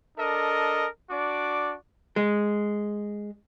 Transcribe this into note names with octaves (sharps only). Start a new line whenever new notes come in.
D4 A4 A#4 D#5
D4 F#4 D5 D6
G#3